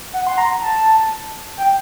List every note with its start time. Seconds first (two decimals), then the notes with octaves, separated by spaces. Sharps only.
0.13 F#5
0.27 C6
0.38 A#5
0.62 A5
1.57 G5